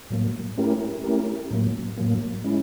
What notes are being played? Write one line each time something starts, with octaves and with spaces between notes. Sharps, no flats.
A2 F#3 A#3
A3 C#4 E4 G4 A#4
A3 C#4 E4 G4 A#4
A2 F#3 A#3
A2 F#3 A#3
G#3 C#4 E4